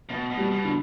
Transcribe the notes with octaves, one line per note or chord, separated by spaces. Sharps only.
B2 B3
B2
G3
B2
D3